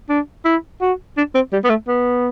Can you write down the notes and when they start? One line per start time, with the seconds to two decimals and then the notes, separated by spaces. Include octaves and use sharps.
0.09 D4
0.45 E4
0.81 F#4
1.17 D4
1.34 C4
1.53 G3
1.64 B3
1.69 A3
1.88 B3